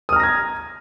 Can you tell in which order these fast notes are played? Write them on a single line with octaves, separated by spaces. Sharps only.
D#6 F6 A#5 A#6 G#6